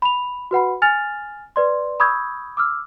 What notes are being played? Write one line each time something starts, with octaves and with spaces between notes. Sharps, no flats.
B5 F7
F#4 B4 F#5 B5
G#5 F6 A6 F7
B4 D5 C6
B5 C#6 D#6 E6 G6 G#6
D6 E6 F6